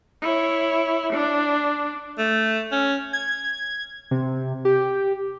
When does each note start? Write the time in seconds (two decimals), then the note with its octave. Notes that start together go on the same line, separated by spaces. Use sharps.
0.22 E4 C#5
1.13 D4
2.18 A3
2.72 C#4
3.13 G#6
4.11 C3
4.65 G4